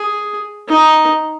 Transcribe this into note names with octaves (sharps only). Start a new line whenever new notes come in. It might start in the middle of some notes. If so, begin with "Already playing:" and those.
Already playing: G#4
D#4